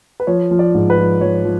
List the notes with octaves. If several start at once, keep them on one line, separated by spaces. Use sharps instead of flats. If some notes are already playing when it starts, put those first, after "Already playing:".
B4
F3 C#5
F3
D5
G#2
B4
F3
F3 C#5
F3